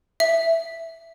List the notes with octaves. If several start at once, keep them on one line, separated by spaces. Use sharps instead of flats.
E5